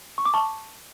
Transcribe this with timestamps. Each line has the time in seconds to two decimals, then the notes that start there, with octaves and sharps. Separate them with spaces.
0.18 C#6
0.25 D6
0.34 A5 C#6